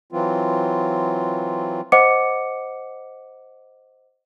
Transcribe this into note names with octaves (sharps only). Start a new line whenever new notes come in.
E3 F#3 C4 F4
C5 D#5 F#5 D6 C#7